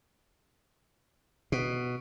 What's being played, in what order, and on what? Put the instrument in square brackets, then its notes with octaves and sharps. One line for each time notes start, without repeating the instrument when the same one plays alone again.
[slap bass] B2